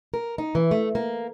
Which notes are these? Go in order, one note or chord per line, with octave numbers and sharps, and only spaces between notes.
A#4
D#4
E3
A3
A#3